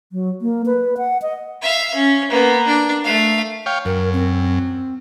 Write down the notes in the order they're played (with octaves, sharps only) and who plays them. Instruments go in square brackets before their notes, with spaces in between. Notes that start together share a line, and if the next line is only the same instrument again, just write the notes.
[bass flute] F#3
A#3
B4
F#5
D#5
[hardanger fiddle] E5 F5
C#4
A#3 B3
D4
A3 F5
[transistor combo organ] C#5 F5 G5
[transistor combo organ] F#2 [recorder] A#4
[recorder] C4